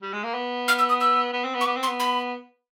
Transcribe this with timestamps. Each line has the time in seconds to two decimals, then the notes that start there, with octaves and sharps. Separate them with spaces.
0.02 G3
0.13 G#3
0.24 A#3
0.35 B3
0.68 F6
0.79 E6
0.89 D#6
1.01 E6
1.33 B3
1.44 C4
1.55 B3
1.61 C#6
1.66 B3 D6
1.77 C4
1.83 C6
1.88 B3
2.00 B5